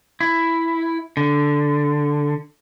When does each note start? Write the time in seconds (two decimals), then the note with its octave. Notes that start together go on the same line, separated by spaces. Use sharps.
0.21 E4
1.17 D3